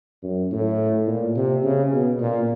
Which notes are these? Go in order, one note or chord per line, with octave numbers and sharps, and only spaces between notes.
F#2
A2
A#2
C3
C#3
B2
A#2